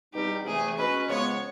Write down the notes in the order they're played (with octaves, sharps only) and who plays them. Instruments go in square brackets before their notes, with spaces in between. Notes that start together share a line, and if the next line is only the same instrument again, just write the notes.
[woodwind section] E2 B2 G3 C4 D#4 [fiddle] G4
[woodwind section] E2 C3 E3 A3 [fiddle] G#4
[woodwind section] B2 G#3 C#4 F#4 [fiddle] B4
[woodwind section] C#3 F3 G#3 B3 [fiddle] C#5